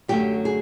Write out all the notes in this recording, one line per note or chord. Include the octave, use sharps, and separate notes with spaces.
F#2 D3 F#3 A3 G4
G#4